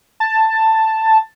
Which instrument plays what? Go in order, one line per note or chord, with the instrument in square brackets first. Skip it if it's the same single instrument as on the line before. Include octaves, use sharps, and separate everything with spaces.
[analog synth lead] A5